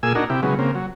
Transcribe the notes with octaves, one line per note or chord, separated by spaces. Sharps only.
A#2 G#4 G#5 E6
D4 D#4 F#4 A#4
C3 E4 G4
C#3 F#3 G#3 B3
C#3 A#3 C4
F#3